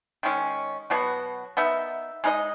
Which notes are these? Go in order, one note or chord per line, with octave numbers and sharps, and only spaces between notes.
D#3 G#3 C#4
B2 F#3 B3 F#4
B3 D#4 A#4 E5
G#3 D#4 A#4 D#5